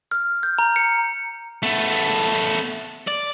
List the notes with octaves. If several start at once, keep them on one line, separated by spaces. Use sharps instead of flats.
F6
G6
A#5
C#7
A3 B3
D5